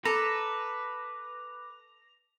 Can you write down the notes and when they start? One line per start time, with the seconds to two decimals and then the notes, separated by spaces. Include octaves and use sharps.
0.05 A4 B4 A#5 D6